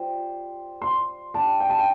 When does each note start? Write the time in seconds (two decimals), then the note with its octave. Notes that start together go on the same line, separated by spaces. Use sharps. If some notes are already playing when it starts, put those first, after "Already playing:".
Already playing: G3 F4 C5
0.82 C6
1.34 D4 G4 D5 A5
1.60 G5
1.69 A5
1.79 G5